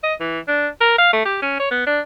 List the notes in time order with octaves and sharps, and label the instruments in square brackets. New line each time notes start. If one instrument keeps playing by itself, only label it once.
[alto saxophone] D#5
E3
D4
A#4
F5
A3
G4
C#4
C#5
B3
D4